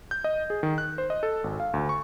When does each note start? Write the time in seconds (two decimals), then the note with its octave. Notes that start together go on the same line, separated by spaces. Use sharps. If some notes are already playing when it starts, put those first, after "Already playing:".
0.11 G6
0.24 D#5
0.50 G#4
0.63 D#3
0.78 F#6
0.98 C5
1.10 D#5
1.23 A4
1.44 G#1
1.60 F5
1.74 D2
1.89 C#6